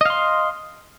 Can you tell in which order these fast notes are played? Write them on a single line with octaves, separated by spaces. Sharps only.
D#5 F5 C6